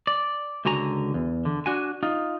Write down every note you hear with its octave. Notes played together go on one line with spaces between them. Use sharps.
D5
C#2 D3 F#4 G#5 A#5
E2
D3
D4 F#4 G#5
D#4 F4